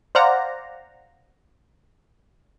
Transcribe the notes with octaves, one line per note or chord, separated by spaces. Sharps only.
C5 D5 F5 F#5 A#5